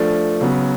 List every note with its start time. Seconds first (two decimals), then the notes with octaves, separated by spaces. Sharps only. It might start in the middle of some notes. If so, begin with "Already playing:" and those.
Already playing: F3 A3 D4
0.41 C#3 F#3 B3